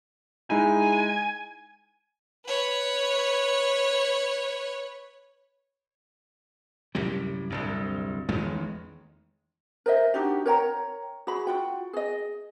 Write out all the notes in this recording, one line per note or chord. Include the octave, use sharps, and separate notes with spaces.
G#3 D#4 E4 G#5
B4 C#5
C2 F#2 A2 G3
D1 C2 G2
A1 E2 D#3 G#3
A#4 C5 D#5 E5
D4 D#4 F#4 G4
A#4 C#5 G5 A#5
F#4 G#4 B5
F4 F#4 G5
G#4 D#5